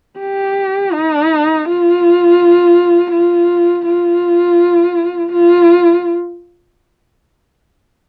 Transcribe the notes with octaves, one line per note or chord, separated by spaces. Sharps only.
G4
D#4
F4
F4
F4
F4